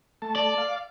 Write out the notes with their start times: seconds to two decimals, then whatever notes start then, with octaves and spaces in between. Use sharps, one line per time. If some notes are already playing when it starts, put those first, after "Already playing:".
0.22 A3 A5
0.36 D5
0.58 F5